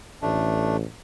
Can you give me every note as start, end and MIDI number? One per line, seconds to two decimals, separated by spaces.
0.22 0.83 33
0.22 0.77 57
0.22 0.77 62